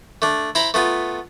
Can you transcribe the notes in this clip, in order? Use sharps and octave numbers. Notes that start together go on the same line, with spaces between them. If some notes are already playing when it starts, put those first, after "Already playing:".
A3 D4
E4 C5 A#5 B5
A3 B3 F4